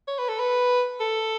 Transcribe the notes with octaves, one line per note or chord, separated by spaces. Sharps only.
C#5
B4
A4
B4
A4